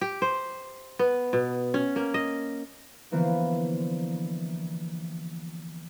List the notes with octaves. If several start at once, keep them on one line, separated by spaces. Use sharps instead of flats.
G4
C5
B3
B2
C#4
A#3
D#5
D3 E3 F3 A#3 B3 C5